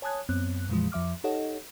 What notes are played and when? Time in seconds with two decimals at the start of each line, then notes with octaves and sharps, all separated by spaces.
0.02 C#5 G#5 A5 D#6 F#6 G#6
0.29 F#2 B3 C4 F#6
0.69 F2 A#2 E3 F3 G#3
0.92 F2 F3 E5 D6 F6
1.24 D#4 G4 A4 C#5 D#5 F#5